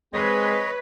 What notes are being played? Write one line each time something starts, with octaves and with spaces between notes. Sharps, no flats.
G#3 C4 G#4 B4 C#5 D#5